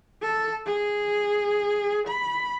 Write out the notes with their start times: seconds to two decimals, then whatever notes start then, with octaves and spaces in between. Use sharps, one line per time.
0.22 A4
0.66 G#4
2.07 B5